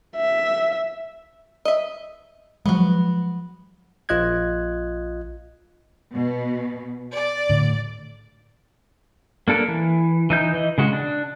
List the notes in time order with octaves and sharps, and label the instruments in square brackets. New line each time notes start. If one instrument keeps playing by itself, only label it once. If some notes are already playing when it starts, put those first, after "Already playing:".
[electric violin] E5
[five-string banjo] D#5 E5
[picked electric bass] F3 F#3 G#3 [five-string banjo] B3 F#4
[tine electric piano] A#1 F4 D#5 F#6 G#6
[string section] B2
D5
[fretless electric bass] A2 D3 A3
[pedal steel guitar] A#3 D4 A4 A#4
E3
E3 D#4 G6
E3 D#5
C#3 G#3 F#4
D4